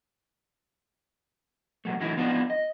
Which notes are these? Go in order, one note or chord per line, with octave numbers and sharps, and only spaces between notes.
C3 F#3 A3
D3 E3 F#3 A3 D#4 E4
F3 B3 C4 D4 D#4 F4
D#5